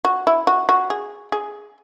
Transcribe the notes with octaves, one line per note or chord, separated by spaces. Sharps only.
F#4
E4
F#4
F#4
G#4
G#4